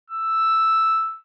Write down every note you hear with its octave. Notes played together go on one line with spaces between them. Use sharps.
E6